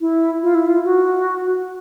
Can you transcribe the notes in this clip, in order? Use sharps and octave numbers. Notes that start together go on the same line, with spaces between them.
E4
F4
E4
F4
F#4